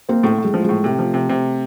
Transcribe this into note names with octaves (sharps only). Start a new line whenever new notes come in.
A#3 C4
A2 A3
A2
G#3
F3
A2 G#3
C3 A3
F3
C3
C3